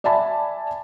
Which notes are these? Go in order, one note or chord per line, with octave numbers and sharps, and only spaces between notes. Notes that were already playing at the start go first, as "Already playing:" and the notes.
D5 E5 G#5 A5 B5